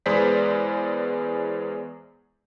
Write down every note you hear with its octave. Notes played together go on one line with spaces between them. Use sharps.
E2 G#3 B4 C5 D5 B6